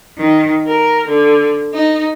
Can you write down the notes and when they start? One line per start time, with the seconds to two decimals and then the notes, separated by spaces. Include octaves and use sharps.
0.17 D#3
0.67 A#4
1.08 D3
1.73 D#4